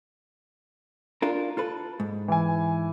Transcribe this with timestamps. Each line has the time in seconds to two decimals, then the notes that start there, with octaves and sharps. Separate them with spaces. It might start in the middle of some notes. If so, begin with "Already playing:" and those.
1.22 D4 F4 A#4
1.57 F4 A4 B4
2.00 G#2
2.28 E3 G#5